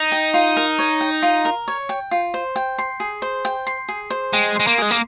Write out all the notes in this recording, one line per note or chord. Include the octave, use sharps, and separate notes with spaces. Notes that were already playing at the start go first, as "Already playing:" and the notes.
Already playing: D#4
G5
F4
A#4
C#5
G5
F4
A#4
C#5
G5
F4
C5
G5
C6
G#4
C5
G5
C6
G#4
C5
G#3 G5
G#3 C6
A#3
G#3 G#4
A#3